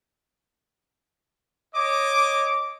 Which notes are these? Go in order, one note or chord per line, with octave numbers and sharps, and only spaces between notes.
C#5 D#5 D6